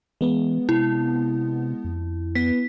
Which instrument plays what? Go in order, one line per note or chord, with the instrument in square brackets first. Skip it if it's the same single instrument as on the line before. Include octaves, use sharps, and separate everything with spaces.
[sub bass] E3 [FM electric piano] G#3 B3
[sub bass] C3 [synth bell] E4
[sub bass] F2
[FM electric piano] B3 [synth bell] B6